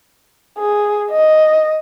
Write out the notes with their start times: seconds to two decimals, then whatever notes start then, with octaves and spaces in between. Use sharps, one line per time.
0.58 G#4
1.11 D#5